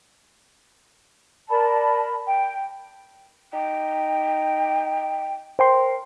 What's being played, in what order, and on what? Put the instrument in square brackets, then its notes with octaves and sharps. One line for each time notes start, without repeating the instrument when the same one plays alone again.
[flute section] A#4 D5 A5 B5
G5
[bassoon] D#4 [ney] G5
[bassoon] A#4 [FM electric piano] C5 G5 C6